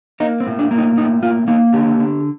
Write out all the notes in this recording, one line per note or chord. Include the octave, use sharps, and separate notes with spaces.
A#3 D#4
C4
A2
D4
A#3
D#4
A2 D#4
A#3 F4
A#3 D#4
D3 G4
D3